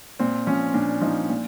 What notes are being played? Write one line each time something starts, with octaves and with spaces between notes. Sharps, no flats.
A#2 C4
F3 C#4
A#2 D4
F3 D#4
A#2